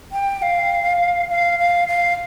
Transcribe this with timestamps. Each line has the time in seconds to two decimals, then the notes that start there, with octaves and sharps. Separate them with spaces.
0.12 G5
0.42 F5
1.30 F5
1.59 F5
1.88 F5